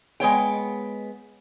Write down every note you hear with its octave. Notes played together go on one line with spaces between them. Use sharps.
G#3 B3 C#5 G5